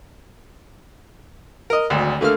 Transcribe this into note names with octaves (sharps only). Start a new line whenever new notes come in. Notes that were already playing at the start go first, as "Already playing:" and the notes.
A#4 D#5
G#1 D2
D3 A3 A#3 F6